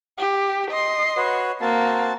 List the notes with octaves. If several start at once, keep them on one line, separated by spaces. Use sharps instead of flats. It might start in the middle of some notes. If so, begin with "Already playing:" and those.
G4
D#5 C6
F#4 B4 C#5
A#3 C4 F#4 A5